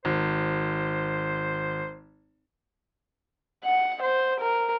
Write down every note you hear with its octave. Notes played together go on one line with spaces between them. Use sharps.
G#1 C5
F#5
C5
A#4